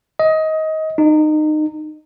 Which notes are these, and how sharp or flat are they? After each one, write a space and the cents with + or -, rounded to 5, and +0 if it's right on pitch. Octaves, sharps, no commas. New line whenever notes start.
D#5 +20
D#4 -25